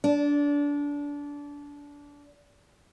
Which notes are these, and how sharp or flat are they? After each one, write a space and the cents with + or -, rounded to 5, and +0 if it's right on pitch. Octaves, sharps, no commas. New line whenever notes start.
D4 -25